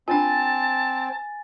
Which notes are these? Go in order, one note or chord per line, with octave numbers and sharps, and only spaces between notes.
C4 D4 F4 G#5 A5 A6